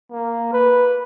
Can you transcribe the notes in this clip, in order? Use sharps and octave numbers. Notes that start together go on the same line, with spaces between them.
A#3
B4